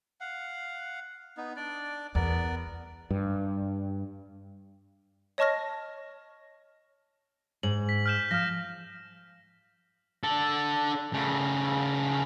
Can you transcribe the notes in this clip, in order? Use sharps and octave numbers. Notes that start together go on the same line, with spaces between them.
F5 F#5
B3 D#4
D4 D5
E2 B3 A#4 D5
G2
C#5 D#5 A5 C#6 F6 A#6
G#2 F#7
B6
F6 G6 E7
F3 F6 A#6
D4 A4
C#3 A3